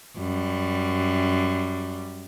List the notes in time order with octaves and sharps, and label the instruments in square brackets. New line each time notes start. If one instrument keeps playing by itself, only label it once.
[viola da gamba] F#2 G3